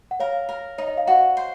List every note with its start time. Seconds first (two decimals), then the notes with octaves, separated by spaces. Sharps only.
0.11 F#5
0.20 A#4 C#5 F5
0.49 A#4
0.78 D#4 C#5
0.88 D#5
0.97 F5
1.07 F#4 D#5 F#5
1.37 C5